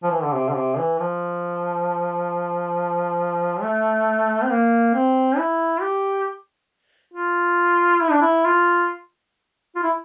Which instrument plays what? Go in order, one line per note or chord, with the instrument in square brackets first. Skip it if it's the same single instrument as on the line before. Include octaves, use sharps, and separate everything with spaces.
[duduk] F3
E3
D3
C3
D3
C3
E3
F3
A3
C4
A#3
C4
E4
G4
F4
E4
D4
E4
F4
F4
E4